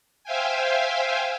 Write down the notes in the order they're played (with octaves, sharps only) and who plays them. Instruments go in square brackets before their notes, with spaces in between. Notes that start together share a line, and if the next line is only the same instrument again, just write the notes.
[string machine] C5 E5 F5 G5 G#5